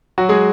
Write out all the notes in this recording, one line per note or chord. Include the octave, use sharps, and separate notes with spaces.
F#3 F#4
G#3 G#4